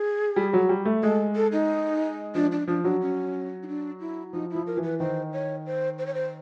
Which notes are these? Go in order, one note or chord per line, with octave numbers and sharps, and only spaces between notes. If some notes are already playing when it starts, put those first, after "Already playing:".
Already playing: G#4
G3
F#3
G3
A3
G#3 A4
A4
D#4
F3 D4
D4
F3 D4
F#3 D4
C#4
D#4
D4
E4
F3 D#4
F3 E4
A#4
E3
B4
D#3 C5
C#5
C5
C5
C#5
C5